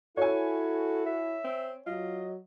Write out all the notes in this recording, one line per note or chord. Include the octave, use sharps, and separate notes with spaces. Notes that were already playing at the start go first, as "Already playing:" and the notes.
E4 F#4 A4 C#5 G#5
E5
C4
F#3 F4 D#5